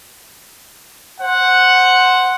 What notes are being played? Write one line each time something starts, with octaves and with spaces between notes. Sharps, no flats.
C5 F#5